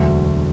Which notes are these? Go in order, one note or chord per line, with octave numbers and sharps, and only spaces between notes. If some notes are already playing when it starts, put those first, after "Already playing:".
Already playing: E1 D2 D3 F#3 E5